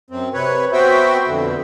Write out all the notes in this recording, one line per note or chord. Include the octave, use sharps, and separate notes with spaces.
F#2 C4
C3 B4 C#5
B3 C4 F#4 C5 E5 G5
F2 B2 D3